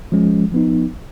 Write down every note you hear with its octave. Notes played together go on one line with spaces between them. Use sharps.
F3 G#3 C#4
F3 B3 D#4